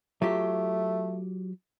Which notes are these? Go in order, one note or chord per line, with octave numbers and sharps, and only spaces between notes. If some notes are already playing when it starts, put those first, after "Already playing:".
F#3 A3 F4 G4